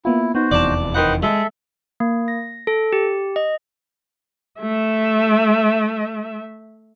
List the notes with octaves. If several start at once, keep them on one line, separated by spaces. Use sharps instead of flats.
A#3 B3 E4 F4
B3 D#4 F#4 C5
F1 E2 E3 D5 A5
D#3 B4 C5 D#5 F#5
G#3 A4 E5
A#3
A#6
A4
G4
D#5
A3 E5